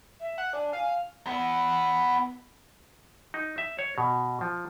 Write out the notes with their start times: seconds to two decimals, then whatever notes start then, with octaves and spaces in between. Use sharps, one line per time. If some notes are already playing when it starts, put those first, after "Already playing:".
0.20 E5
0.38 F#5
0.53 D4 G#5
0.73 F5
1.27 B3 E4
3.34 D#4
3.58 E5
3.79 C#5
3.98 B2
4.41 F3